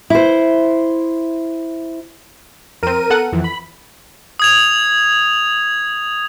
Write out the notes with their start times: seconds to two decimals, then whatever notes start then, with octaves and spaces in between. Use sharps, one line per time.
0.10 E4 C5
2.83 F2 C4 A#4 D#7
3.10 B3 A4 F#5
3.33 F2 E3
3.44 B5
4.40 D#6 G#6 F7